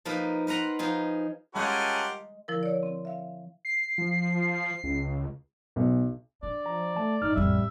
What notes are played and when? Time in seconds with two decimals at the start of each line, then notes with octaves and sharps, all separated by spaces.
0.05 F3 A#3 D#4 A#4 B4
0.47 A#4 B4 F#5 A#5 C6
0.79 F3 D#4 G#4
1.55 G#3 C#4 F4 G4 G#4 A#4 F#5 A5
2.48 D3 F3 E4 A#4
2.63 C#5 D5
2.83 C4
3.05 E5 F5
3.65 C7
3.98 F3
4.84 C#2
5.76 B1
6.43 D4 D5
6.66 F3 A#5
6.96 A3 A5
7.22 G#2 D#4 F6
7.35 A1 F2 G3 E5